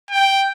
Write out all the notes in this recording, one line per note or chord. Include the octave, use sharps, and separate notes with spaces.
G5